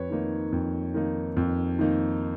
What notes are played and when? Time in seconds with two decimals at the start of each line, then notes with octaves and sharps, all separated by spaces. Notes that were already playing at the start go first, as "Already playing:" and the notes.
Already playing: F2 B4 C#5
0.10 D#3 A#3 D#4
0.52 F2
0.94 D#3 A#3 D#4
1.37 F2
1.79 D#3 A#3 D#4